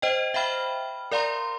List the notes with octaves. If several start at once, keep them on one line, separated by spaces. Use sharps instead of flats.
C5 D#5 G5
E5 F5 G5 B5 F6
A#4 D5 F5 A#5 C6